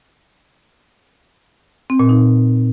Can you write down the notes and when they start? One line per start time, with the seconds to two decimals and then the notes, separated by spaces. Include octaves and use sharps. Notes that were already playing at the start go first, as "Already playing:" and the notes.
1.90 C4
1.99 A#2
2.09 D#4